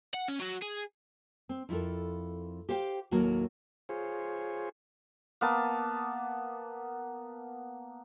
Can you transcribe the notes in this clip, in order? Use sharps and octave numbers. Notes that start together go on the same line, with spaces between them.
F#5
C#4
F#3 F#4
G#4
C4
F2 E4 F4 A4 A#4
G4 C5 F5 G5
D#2 A2 F#3 A#3 F#4 A#4
F4 G#4 C5 C#5
A#3 B3 A5